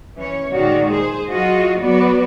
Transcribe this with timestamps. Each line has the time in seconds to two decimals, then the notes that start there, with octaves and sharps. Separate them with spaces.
0.16 E3 C#4 C#5
0.51 A#2 D#3 G#3 F#4 D5
0.90 G#4 C5
1.29 F#3 F4 F#4 G#4 D#5
1.81 F#3 B3 F#4 B4 D5